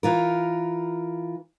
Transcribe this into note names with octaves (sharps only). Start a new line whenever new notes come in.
E3 F4 A#4